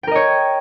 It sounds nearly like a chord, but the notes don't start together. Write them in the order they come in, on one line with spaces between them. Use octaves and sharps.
G5 A#4 D#5 C#5